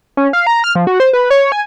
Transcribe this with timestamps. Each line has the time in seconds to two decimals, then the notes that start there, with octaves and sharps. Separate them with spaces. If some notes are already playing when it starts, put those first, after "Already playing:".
0.17 C#4
0.33 F5
0.47 A#5
0.64 F6
0.75 F3
0.87 F#4
1.00 C5
1.13 B4
1.30 C#5
1.52 G#5